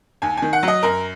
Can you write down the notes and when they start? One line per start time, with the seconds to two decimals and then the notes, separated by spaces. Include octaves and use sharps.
0.22 D#2 G#5
0.37 D#3 G#5
0.53 F#5
0.63 F#3 D#5
0.83 F#2 A#4